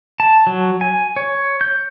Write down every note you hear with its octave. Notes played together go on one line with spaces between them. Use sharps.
A5
F#3
G#5
C#5
G6